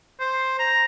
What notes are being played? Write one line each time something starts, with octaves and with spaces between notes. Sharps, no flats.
C5
A#5